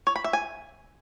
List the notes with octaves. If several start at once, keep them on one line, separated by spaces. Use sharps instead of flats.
C#5
B5
E5
G#5